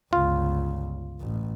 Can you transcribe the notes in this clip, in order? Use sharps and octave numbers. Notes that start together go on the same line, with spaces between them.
G1 C#2 F4
A1